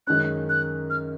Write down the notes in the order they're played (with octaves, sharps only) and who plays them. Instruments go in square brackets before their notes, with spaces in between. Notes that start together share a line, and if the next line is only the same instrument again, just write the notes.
[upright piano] F#2 D#3 G#3 C#4 [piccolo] F#6
[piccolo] F#6
F6